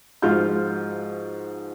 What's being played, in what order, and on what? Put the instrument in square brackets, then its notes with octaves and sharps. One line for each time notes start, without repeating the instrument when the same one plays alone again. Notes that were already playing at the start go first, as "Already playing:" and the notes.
[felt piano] G#2 F3 F4 F#4 F6 G6